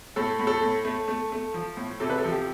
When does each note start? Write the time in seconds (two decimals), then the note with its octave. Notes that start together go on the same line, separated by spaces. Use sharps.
0.16 A2 A4
0.39 A2
0.47 A4
0.62 A2
0.85 A3
1.08 A3
1.32 A3
1.54 F3
1.77 A2
2.00 C3 A4
2.10 B4
2.18 A4
2.24 F3
2.32 G4